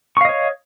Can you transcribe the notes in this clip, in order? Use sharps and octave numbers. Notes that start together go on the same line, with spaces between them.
C#5 D#5 F5 C#6